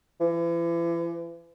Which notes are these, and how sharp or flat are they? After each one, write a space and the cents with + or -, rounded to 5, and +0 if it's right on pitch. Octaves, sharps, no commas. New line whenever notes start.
E3 +40